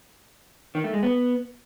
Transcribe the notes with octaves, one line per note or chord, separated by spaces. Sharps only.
D#3
A3
G#3
B3